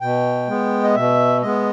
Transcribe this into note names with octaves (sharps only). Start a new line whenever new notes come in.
B2 G5
G#3 B3
D#5
B2 E5
G#3 B3 D#5